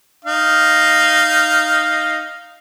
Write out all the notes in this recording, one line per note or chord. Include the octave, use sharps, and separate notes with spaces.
D#4 F5